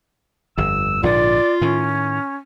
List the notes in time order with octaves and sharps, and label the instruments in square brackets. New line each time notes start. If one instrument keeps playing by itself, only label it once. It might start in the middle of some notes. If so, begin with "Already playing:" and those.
[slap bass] G1 F2 [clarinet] E6
[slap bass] A#1 G#2 D3 [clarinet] F4 [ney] D5
[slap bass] A2 D#3 [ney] C#4